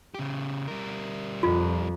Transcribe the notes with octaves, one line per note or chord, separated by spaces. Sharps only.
C#3 G4
G3 A#4
F2 F4